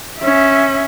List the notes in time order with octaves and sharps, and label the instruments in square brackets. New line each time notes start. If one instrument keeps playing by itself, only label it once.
[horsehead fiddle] C#4 E5